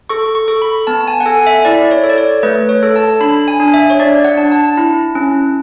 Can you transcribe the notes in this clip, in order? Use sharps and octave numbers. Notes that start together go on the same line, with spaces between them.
A4 C#6
C#6
A4
B5
B3 A5
G#5
F#5
A4 G#5
E5
E4 D5
C#5
A4
D5
C#5
A3 B4
C#5
A4
A5
D4 B5
G#5
D4
E5
C#5
D4 D5
F#5
D4
A5
E4
C#4